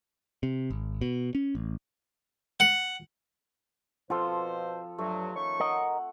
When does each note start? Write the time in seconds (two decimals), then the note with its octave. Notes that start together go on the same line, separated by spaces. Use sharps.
0.43 C3
0.70 G#1
1.01 B2
1.35 C#4
1.55 A1
2.60 F#5
4.10 B2 F3 C4 F4 A4 C5
4.98 G2 F#3 A3
5.35 D#3 C#4 C#6
5.60 A#4 D#5 F#5